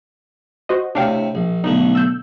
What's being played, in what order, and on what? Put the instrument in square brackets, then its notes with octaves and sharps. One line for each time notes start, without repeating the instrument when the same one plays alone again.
[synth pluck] F#4 C5 D#5
[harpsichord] A2 C3 [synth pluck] D4 F5 G5
[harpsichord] A#1
[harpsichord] B1 D3 A3 [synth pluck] D#4
[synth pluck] E6 G6